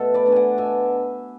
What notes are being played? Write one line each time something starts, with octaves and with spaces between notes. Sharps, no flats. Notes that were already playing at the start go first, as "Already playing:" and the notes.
Already playing: B2 A3 A4 E5 F#5
B4 D5
A3 D4
D5 F#5 G#5
B2 E5 G#5